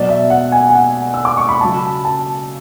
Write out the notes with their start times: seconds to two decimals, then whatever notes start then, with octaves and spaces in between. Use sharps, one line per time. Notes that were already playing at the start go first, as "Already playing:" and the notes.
Already playing: B2 F#3 D5
0.09 E5
0.30 F#5
0.52 G#5
0.69 G#5
0.75 F#5
1.14 E6
1.25 D6
1.37 C#6
1.49 B5
1.61 C#3 F#3 A5
2.05 A5